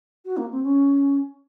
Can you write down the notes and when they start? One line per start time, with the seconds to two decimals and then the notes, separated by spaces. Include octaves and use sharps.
0.25 F#4
0.37 A#3
0.51 C4
0.63 C#4